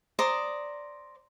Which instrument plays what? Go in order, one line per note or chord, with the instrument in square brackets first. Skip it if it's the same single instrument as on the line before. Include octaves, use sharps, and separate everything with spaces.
[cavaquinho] C5 D5 A#5 D#6